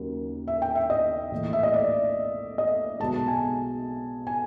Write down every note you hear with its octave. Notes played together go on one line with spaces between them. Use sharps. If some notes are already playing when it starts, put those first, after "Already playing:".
Already playing: D#2 C#3 F#3 A#3
E5
G5
E5
D#5
A#1 A2 E3 A3
E5
D#5
D5
D#5
B1 B2 G#3 A5
G#5
G#5